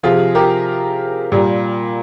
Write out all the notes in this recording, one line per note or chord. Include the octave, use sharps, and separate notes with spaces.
C3 F3 F4 G#4
G4 A#4
A#2 G3